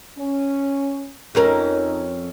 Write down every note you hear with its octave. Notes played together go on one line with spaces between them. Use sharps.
C#4
F2 C#4 D#4 A#4